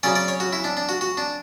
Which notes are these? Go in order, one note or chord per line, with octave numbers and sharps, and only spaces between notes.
C#3 F#3 C#4 D5
D5
C#5
F#4
E4
D4
D4
F#4
F#4
D4